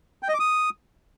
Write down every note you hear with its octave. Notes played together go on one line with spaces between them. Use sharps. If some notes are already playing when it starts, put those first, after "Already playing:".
G5
D#5
D6
D#6